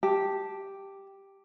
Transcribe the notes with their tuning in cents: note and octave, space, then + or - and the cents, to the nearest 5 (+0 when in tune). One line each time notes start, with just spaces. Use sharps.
G4 +0 A5 +0